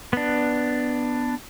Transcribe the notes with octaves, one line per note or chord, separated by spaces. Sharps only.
B3 D4